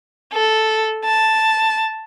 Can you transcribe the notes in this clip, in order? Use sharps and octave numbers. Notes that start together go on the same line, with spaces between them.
A4
A5